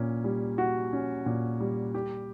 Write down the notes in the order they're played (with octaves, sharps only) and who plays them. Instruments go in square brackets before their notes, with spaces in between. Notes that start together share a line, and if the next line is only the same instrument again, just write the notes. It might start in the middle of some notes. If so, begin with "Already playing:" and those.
Already playing: [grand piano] A#2 C#4
G3
F#4
C#4
A#2
G3
G4